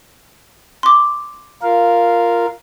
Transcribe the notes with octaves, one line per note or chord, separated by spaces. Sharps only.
C6 D6
F4 A#4 F5